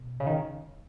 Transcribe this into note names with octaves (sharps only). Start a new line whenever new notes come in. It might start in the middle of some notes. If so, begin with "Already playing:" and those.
Already playing: B2
C#3
D#3